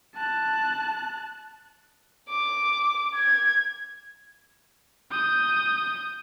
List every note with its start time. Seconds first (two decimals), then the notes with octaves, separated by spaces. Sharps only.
0.15 A5 F#6
2.29 D6
3.15 G#6
5.11 D#6 G6